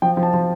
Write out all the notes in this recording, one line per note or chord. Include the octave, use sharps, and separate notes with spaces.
F3 G5
F3
A5
F3